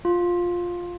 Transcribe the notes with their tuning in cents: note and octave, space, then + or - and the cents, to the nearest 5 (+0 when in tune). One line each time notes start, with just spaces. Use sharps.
F4 +10